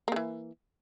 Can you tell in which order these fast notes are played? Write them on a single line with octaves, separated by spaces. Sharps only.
A#3 C#3 E3